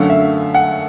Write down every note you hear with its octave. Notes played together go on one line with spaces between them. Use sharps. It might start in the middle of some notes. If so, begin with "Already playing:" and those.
Already playing: F#2 D3 F#3 A3 F5
E5
F#5